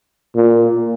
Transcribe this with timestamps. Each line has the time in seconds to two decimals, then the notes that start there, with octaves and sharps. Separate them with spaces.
0.36 A#2